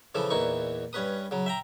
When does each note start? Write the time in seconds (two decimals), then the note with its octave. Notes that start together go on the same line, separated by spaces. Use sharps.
0.15 C#3 E3 F3 A4
0.30 E2 A#2 E3 D#4 C#6
0.93 G2 C#4 B4 D#6
1.31 C#3 F#3
1.46 E5 G5 A#5